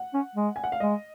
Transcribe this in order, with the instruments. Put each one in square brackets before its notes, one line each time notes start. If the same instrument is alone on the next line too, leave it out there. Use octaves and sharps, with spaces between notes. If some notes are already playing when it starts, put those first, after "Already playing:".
Already playing: [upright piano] F#5
[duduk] C#4
G#3
[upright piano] G#5
F#5
F5
[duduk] G#3 [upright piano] D#5